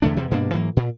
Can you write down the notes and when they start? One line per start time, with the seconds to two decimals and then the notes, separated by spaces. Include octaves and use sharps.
0.02 E2 D3 A3 D4
0.17 E2 C3
0.31 G2 B2 A#3 D4
0.53 G#2 E3 F#3 A#3
0.77 A#2